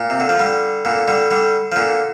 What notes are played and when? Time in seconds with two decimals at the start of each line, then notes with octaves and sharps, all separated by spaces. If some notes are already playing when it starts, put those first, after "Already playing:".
Already playing: A#2
0.10 C3
0.20 D3
0.29 F3
0.39 D3 G3
0.85 A#2 D3
1.08 D3 G3
1.31 D3 G3
1.72 F3
1.76 A#2 D3